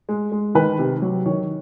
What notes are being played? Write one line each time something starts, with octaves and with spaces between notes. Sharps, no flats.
G#3
G#3
D#3 B4
C3
F#3
D#3 C#5